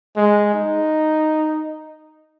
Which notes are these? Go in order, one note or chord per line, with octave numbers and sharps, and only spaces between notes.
G#3
D#4